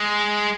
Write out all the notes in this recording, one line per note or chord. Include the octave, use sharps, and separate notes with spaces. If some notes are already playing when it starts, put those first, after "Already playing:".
Already playing: G#3